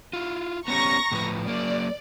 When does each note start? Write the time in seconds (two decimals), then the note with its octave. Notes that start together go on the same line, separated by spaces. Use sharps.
0.13 E4 F4
0.68 B3 C#4 G4 A#5 C#6 A#6
1.12 A2 F3 B4
1.48 F#3 A#3 D5